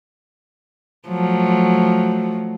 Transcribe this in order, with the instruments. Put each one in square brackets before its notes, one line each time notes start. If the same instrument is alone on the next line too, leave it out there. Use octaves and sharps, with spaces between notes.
[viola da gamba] F3 F#3 A3